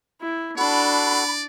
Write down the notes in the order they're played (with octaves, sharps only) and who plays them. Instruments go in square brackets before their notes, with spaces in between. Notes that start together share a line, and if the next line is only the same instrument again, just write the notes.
[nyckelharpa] E4
[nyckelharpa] D4 [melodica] F#4 A4 F#5 [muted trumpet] D5 [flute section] B5